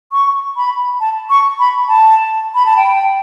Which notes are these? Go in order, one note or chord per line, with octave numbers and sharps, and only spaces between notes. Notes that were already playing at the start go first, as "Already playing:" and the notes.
C#6
B5
A5
C#6
B5
A5
B5
A5
G5